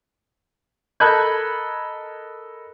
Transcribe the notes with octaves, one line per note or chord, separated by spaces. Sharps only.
A4 A#4 D#5 B5 F#6 G#6